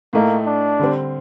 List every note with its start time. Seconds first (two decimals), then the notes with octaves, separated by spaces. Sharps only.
0.13 A2 A3 A#3 D#4
0.46 D4
0.79 D3 G3 C4